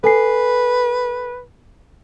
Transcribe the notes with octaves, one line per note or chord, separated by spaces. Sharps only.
A4 B4 G#5 C7